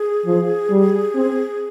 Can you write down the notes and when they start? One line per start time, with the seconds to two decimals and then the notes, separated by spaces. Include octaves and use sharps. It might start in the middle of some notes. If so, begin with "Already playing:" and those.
Already playing: G#4
0.26 F3
0.70 G3
1.14 C4